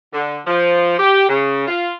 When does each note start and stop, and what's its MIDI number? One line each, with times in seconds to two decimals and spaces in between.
0.13 0.40 50
0.47 0.96 53
0.99 1.28 67
1.29 1.67 49
1.68 1.93 65